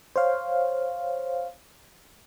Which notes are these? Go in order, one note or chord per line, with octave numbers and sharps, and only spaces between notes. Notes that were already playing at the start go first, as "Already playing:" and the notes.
C5 C#5 F5